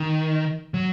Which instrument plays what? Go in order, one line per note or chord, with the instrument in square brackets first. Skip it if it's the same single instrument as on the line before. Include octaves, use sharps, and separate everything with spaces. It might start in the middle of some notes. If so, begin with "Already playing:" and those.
Already playing: [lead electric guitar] D#3
F#3